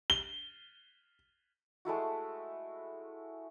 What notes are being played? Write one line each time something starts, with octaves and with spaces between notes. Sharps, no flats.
G7
G#3 A3 E4 F#4